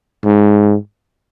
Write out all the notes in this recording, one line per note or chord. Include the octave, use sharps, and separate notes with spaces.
G#2